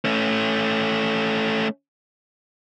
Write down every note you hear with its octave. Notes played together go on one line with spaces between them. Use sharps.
A3 C#4